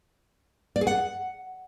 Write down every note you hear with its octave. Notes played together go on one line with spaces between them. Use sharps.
D5
G#4
F#5